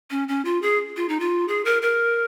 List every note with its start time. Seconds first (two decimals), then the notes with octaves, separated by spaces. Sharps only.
0.11 C#4
0.28 C#4
0.45 F4
0.62 G#4
0.97 F4
1.09 D#4
1.20 F4
1.48 G#4
1.65 A#4
1.82 A#4